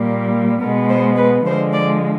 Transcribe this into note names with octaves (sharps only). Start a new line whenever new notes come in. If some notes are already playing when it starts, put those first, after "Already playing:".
Already playing: A#2 G3 A#3
B2 G#3 B3 A#4
C5
B4
D3 F3 G#3 C5
D5